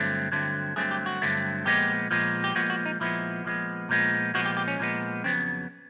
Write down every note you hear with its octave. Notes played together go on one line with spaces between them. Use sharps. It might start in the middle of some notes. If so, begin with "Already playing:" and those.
Already playing: G2 D3 F#3 A3 C4
G2 D3 F#3 A3 C4
G2 D3 F#3 A3 C4 G#4
G4
F#4
G2 D3 F#3 A3 C4
A#2 F3 G#3 B3 G4
A#2 F3 G#3 B3
G4
A#2 F3 G#3 B3 F#4
F#4
D#4
A#2 F3 G#3 B3 E4
A#2 F3 G#3 B3
A#2 F3 G#3 B3
A#2 F3 G#3 B3 F#4
G4
G4
C#4
A#2 F3 G#3 B3
F2 C#3 F#3 B3 C4